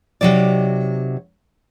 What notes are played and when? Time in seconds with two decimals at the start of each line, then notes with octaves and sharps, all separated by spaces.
0.21 C3 E3 F#3 D#4 D5